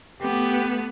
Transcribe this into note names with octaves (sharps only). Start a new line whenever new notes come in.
A3 B3 G4